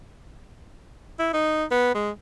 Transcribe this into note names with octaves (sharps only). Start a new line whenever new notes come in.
E4
D#4
B3
G#3